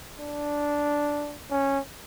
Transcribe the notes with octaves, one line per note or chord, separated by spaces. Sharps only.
D4
C#4